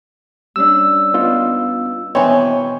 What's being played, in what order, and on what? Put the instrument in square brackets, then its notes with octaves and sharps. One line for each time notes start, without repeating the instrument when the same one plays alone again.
[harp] G3 C#4 D4 [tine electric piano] E6
[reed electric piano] B3 F4 [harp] D#4
[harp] B2 D#3 [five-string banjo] E3 C4 [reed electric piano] C#5